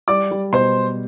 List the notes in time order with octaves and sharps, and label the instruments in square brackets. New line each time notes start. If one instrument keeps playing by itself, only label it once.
[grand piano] G3 [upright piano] D5 D6
[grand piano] G3
[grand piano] B2 [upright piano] C5 C6